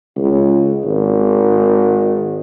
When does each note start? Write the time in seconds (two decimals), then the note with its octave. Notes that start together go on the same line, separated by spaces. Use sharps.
0.17 C#2
0.84 G#1